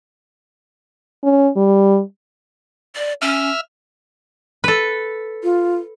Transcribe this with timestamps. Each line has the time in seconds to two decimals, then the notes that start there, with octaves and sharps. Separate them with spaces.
1.23 C#4
1.56 G3
2.96 D5
3.22 C#4 E5 F6
4.64 A4 B4
5.43 F4